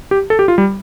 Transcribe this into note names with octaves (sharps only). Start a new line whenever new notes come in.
G4
A4
G4
F4
G3